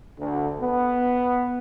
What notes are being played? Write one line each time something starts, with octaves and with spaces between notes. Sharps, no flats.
D2
B3